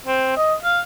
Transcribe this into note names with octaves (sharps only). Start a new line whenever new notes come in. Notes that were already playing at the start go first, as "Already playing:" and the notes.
C4
D#5
F5